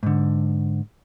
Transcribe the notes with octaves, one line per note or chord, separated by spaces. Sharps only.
G#2 D3